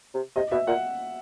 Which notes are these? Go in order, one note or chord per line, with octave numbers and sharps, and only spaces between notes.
C3
C3 D#5
B2 E5
A#2 F#5